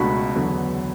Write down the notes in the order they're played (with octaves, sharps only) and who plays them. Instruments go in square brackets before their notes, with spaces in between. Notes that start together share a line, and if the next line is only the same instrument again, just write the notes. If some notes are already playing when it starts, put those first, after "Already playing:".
Already playing: [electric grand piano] C#2 B2 A3 D4 F#4 [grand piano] B5
[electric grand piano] E2 D3 F#3 B3